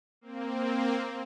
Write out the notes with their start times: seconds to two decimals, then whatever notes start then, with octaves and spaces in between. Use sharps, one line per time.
0.21 A#3 C4